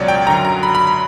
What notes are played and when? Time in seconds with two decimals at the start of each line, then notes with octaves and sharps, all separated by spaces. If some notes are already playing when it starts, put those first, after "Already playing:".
Already playing: C#2 B2 F#3 C#5 D5
0.08 G5
0.27 F#2 D3 F#3 A#5
0.45 A#5
0.63 B5
0.75 B5
0.87 B5